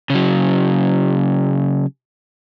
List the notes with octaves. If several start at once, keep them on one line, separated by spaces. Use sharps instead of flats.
C#3 F#3